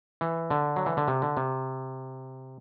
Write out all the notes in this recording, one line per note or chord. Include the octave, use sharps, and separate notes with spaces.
E3
D3
F#3
E3
D3
C3
D3
C3